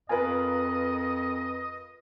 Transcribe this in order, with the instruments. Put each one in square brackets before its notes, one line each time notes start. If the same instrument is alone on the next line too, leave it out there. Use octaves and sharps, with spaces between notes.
[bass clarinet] F2 [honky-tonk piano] F4 A#4 B4 [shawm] D#5 [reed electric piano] G#5